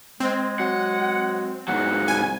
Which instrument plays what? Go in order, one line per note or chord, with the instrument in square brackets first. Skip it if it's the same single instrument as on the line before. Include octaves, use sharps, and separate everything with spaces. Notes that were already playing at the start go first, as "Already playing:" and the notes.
[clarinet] G#3 [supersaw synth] C4
[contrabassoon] F#3 [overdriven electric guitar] F#5
[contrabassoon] F#3
[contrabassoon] E2 [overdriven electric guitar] G#2 F#3 [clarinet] F#5
[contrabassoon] C2 [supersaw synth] G#5